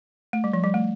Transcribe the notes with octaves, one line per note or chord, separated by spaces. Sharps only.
A3
G3
F3
G3
A3